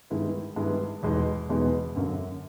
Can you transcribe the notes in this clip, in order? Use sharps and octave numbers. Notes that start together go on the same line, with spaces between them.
G2 D#3 G#3 B3 E4
G2 D#3 G#3 B3 E4
E2 B2 G#3 B3 D#4
E2 B2 G#3 B3 D#4
F#2 D3 F#3 A#3